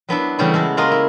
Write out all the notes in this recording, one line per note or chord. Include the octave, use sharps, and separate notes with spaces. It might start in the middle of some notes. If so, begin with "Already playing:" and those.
F#3 B3 D4 E4
C#3 E3 G3 A3 E4 C#5
G#3 F#4 A4
G#3 A#3 F4 A#4 D#5
E4